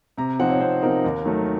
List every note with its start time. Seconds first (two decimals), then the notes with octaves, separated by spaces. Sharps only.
0.18 C3 A#5
0.39 F3 C4 D#4 F#5
0.50 C#5
0.60 C3 C5
0.82 F3 C4 D#4 A#4
1.05 D#2
1.25 D#3 F#3 A3